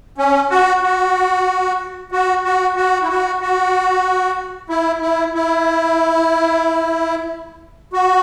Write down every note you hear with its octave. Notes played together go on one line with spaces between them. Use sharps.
C#4
F#4
F#4
F#4
F#4
F#4
E4
F#4
F#4
E4
E4
E4
F#4